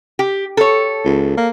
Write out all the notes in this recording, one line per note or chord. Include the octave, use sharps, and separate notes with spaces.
G4
A4 C#5
C#2
A#3